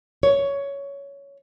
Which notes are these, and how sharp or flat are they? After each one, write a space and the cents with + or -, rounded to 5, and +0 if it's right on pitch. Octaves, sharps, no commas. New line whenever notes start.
C#5 +15